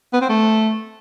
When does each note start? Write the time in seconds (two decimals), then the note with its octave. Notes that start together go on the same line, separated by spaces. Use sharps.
0.13 B3
0.21 C4
0.29 A3